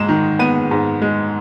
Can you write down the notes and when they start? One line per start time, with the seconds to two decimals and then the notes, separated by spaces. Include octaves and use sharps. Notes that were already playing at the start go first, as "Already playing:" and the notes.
Already playing: G#2 G#3 E7
0.09 D#3
0.39 B3 D#7
0.71 G#2
1.02 G#3